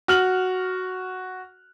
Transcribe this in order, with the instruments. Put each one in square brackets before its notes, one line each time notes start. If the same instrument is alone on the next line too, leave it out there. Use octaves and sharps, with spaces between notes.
[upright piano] F#4 F6 F#7